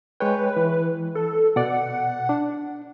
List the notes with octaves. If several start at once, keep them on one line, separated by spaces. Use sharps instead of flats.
G#3 B4 C#5 G5
E3
A4
B2 D5 F#5
D4